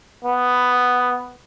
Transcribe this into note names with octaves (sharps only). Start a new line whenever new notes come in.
B3